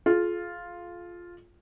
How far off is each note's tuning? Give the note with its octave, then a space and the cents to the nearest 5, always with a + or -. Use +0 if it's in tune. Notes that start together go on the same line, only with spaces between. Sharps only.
F4 +0 G#4 +45